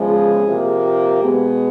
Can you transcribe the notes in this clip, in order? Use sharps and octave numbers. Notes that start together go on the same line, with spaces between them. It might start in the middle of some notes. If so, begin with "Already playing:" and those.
Already playing: E2 C#3 F3 G#3
G#4
C3 F3 A#3
G4
B2 G#3 B3